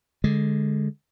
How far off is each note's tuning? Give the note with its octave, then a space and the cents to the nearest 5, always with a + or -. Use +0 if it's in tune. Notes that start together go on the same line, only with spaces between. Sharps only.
D3 +0 G#3 +5